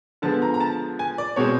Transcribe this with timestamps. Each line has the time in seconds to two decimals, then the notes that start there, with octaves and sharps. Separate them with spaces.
0.22 D3 F3 G#3 B3 A5
0.42 A#5
0.54 A#5
0.60 A5
0.99 G#5
1.18 D5
1.36 B2 G#3 C4 C#5